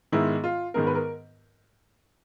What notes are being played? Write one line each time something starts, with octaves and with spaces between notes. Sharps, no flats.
G#2 D#3 G#3 B3 E4
F4
G#2 D#3 G#3 B3 A#4
B4
A#4